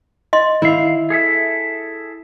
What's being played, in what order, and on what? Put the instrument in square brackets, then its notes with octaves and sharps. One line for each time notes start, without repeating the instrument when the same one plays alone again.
[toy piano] D#5 C6
[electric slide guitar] D#3 F5 [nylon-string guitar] E4
[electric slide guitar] G#4 A4 E5